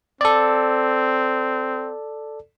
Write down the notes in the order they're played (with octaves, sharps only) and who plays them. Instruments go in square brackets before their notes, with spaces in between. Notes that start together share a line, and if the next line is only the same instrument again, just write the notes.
[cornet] C4 [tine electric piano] A4 D5